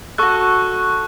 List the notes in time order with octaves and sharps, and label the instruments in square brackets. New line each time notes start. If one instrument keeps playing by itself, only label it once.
[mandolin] F#4 A4 [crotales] C#6 F#6